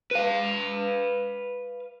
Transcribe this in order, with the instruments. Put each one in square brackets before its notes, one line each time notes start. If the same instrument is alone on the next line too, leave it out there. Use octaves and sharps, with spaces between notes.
[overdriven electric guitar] B4 F5